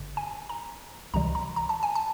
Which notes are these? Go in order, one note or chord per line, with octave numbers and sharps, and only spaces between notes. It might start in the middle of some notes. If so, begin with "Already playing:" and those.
Already playing: G#1 G2 D3
G#5
A#5
C#2 C3 E3 G3 A#5
A#5
A#5
A5
G#5
A5